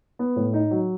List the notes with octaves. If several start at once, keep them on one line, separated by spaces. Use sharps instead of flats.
B3
A2
D#4
F#3